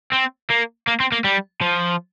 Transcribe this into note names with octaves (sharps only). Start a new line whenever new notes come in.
C4
A#3
A#3
C4
A#3
G3
F3